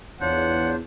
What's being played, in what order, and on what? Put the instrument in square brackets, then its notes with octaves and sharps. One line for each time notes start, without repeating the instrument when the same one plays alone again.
[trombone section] E2 [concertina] D4 F4 C5 [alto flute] C#5 [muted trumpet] F#5